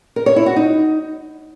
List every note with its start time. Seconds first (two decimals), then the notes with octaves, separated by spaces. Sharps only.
0.16 A#4
0.26 C#5
0.36 E4
0.46 F#4
0.56 D#4